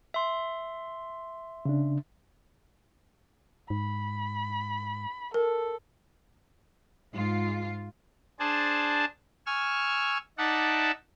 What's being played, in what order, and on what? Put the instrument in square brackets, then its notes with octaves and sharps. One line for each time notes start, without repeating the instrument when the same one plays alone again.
[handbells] E5 C6
[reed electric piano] C#3 D4
[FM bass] G#2 [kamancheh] B5
[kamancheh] A4 [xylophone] A#4
[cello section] G#2 F4
[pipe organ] D4 G#4 C5 A5
G#5 C#6 E6 F6
D#4 D5 E5 F#5 A5